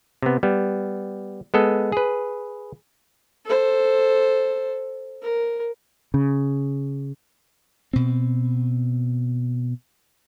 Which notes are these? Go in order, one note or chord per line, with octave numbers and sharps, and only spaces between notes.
C3 B3
G3 B3
G#3 B3 A4 D#5
G#4 B4
A4 C5
A#4
C#3
B2 C4